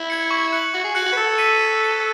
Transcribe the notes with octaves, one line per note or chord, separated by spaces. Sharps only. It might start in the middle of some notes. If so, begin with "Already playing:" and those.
Already playing: E4
G#6 C#7
C#6
F#6 C#7 F#7
F#4 C#6
G#4
F#4 F#6 C#7 F#7
F#4
B4
A4 E6
B6 D#7
E6
B6 D#7